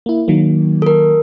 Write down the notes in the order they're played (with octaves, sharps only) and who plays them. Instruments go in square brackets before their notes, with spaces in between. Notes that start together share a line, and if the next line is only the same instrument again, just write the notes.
[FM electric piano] A#3 E4
D#3 F#3 A#3
[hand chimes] A4 A#4